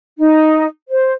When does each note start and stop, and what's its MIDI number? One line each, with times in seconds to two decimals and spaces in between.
0.18 0.66 63
0.89 1.12 72